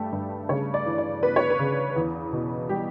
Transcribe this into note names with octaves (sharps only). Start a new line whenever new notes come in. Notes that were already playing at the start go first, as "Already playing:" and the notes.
Already playing: G2 A3 G4 A4
G2
C#3 C#5
D5
E3
D5
B3 B4
C#5
B4
C#3
E2
B2
G3 G4